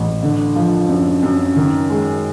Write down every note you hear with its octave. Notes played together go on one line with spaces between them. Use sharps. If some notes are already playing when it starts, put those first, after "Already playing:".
Already playing: A1
D3
F3
F#2
F#2
D#3
G#3